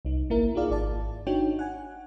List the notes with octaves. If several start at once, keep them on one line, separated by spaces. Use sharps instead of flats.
C2 D#4
G#1 A#3 E4 A#4
D#4 F4 G#4 D5 F5
G#1 D5 A5
D4 D#4 F#4 C#5 G5
F#5 G#5